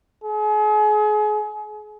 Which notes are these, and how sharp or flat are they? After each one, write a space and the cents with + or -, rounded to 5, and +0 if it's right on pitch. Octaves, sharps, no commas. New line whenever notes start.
G#4 +35